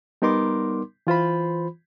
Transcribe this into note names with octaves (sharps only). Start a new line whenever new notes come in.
G3 B3 D#4 A#4 C6 D6
E3 F4 C5 B5